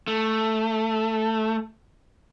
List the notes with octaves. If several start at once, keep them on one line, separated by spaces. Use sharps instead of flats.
A3